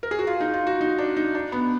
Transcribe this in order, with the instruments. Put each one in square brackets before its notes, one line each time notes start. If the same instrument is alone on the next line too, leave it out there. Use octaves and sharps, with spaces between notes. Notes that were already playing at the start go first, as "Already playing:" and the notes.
[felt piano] A#4
G#4
F#4
F4
D#4
F4
F#4
D#4
D4
D#4
D4
B3